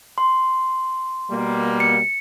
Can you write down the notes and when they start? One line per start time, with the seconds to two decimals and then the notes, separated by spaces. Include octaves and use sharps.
0.18 C6
1.31 B2 G3 A#3
1.80 C#7